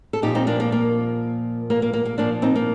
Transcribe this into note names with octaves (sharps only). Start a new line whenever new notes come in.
A4
A#2 F3 D#4 G4
C4 D#4
A#3 D4
A#3
A#3
A#3
A#3
A#3
A#3
A#2 F3 A#3 D4
C4 D#4
A#3